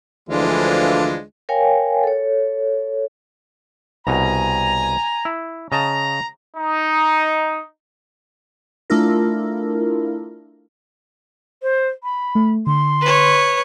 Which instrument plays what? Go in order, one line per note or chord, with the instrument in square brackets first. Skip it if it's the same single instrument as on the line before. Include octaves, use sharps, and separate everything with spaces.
[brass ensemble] D2 E3 F3 [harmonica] G#3 D4 F4
[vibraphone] A#4 C#5 F5 G5 G#5
A4 C#5
[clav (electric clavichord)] C2 B2 [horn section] G#5 A#5
[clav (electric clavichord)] E4
[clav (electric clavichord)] C#3 D#5 A5 [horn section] A#5
[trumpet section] D#4
[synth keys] A3 D4 E4 F4 A#4
[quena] C5
B5
[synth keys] A3
[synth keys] D3 [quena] C6
[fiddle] B4 C#5